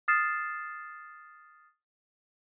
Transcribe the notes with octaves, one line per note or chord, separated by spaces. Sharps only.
D#6 F6 A6 C7 E7